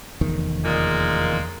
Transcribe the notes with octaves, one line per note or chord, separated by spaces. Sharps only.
F1 E2 D#3
A#2 G#3 A#3